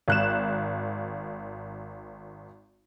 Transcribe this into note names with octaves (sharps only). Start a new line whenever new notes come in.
G#1 F#6 E7